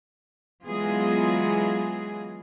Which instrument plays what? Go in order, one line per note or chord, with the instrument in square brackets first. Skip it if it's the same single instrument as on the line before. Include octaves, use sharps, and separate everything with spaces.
[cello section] E3 F#3 G#3 B3 F4 G#4